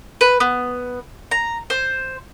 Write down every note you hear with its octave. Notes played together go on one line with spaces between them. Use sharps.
B4
B3
A#5
C5